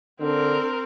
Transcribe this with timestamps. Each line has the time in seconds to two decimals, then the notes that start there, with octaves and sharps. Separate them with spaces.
0.21 D3 C4 A#4